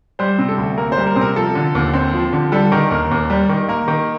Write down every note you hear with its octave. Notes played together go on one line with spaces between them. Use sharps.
G3 C5
C3
A4
D2
A#3 A#4
C5
G3
A#4
C3 C5
A#4
F3 A4
D3
D#2
C4
F3
D3
G3 A4
D#3 A#4
D#2 A#4
D#2
G3
D#3
A#3 A#4
D#3